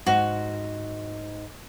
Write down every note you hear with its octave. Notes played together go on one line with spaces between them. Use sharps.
G#2 F#4